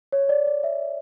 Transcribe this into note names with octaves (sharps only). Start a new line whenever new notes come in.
C#5
D5
D5
E5